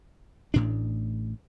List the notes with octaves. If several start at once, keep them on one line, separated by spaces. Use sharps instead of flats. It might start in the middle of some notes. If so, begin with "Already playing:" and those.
A1 A2 D4